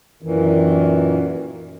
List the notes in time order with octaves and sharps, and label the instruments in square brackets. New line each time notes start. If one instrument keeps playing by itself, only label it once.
[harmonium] F#2 A#2 D#3 E3